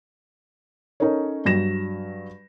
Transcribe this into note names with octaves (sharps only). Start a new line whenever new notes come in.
C#4 D#4 A4 A#4 C#5
G2 F#3 A#6 E7